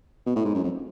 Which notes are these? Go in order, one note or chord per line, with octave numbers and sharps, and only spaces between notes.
B2
A2
G#2
F#2
F2